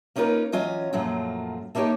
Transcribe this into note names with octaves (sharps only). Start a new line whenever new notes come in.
A#3 C#4 D#4 F4 A#4 B4
E3 F#3 C#4 F4 D#5 G#5
F#2 A#2 F3 F#3 A3 F4
A3 A#3 C#4 D#4 G4 C#5